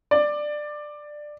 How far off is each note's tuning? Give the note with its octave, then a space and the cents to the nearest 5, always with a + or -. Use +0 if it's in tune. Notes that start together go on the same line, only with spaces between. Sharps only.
D5 +15